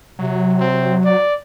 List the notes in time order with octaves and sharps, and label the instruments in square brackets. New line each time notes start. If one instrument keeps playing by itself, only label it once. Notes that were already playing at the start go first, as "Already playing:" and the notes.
[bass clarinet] C3 [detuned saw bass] F#3
[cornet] C4
D5